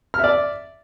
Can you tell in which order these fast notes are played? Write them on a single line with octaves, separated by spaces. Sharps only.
F6 E5 D5